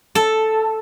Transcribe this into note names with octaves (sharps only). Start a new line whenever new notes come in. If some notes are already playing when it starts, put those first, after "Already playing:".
A4